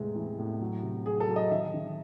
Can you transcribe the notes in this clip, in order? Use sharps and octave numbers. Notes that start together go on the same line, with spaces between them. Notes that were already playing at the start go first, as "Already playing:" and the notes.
Already playing: E2 A2 C3 G#3
E3
A2
F#3
C3
F#3 G#4
A4
F#3
D#5
D#3 E5
D#3